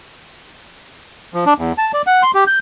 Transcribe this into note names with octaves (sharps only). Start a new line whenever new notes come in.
F3
D4
E2
A5
D5
F#5
C6
G4
G6